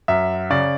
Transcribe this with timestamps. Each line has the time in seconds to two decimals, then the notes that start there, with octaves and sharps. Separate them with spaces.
0.08 F#2 E5
0.50 C#3 D5